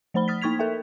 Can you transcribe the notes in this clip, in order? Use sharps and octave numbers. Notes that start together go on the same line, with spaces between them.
F3 A3 C5 B5 G7
D#6 F6 A6 B6
A#3 D#4 C#6 G#6 B6 F7
A4 A#4 E5 G5